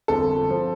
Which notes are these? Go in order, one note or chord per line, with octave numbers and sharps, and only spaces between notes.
G1 F2 F3 C4 A4
F3 C4